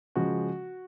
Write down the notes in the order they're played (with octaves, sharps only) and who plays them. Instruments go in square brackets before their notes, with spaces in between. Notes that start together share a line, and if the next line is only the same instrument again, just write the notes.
[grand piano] C#3 F3 G#3 F#4